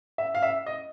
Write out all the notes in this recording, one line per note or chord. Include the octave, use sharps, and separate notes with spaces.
E5
F5
E5
D#5